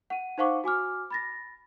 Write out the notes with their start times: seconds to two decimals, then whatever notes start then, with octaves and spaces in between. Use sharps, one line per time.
0.10 F#5 D#7
0.38 D#4 C5 F5 F#5 C#6 D6
0.64 F#4 G#5 D6 F6
1.10 B5 A6 A#6